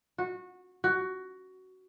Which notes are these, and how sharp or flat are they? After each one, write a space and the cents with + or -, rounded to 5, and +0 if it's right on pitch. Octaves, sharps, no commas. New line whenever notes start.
F#4 -20
F#4 +15